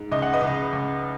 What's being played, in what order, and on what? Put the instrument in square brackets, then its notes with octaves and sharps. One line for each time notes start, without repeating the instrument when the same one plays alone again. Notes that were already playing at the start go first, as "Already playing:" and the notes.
Already playing: [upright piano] G#2
C#2 D#5
F#5
B4 D#5
C#2
C#2